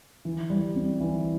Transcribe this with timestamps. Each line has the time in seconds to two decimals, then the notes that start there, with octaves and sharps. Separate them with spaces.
0.25 E3
0.50 G3
0.76 C4
1.00 E3